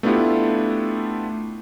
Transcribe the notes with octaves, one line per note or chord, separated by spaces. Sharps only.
A3 B3 D4 E4 F4 G4